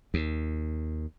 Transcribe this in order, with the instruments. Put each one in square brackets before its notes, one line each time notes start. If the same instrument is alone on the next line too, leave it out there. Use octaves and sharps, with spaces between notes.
[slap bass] D#2